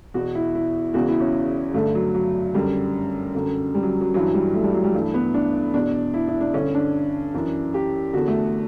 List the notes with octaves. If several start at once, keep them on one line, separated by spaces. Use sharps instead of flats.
E2 B2 F#4
E4
E4
E2 C#3 E3 F#4
E4
C#4
G2 D3 A3
F#3
F#3
F#2 D3 G3
F#2 D3
G3
F#3
F#3
G2 E3 F#3
G3
A3
G3
F#3
G3
G2 E3 A3
B3
D4
E2 B2 D4
E4
E4
D4
G2 D3 C#4
D4
F#2 E3
G4
E2 D3 F#4
A3